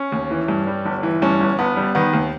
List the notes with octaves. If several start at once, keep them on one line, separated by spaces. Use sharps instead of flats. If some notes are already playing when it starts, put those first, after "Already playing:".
Already playing: C#4
D#2
E3
G2
G3
G1
E3
G2 C#4
G1
G1 B3
G3
D#3 B3
D#2